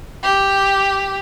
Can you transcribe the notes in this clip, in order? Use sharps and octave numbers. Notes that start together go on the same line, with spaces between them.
G4